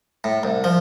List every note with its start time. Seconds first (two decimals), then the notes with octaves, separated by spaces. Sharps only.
0.24 A2
0.43 C2
0.64 F3